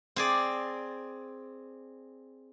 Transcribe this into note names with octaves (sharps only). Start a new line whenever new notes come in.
C4 G#4 D5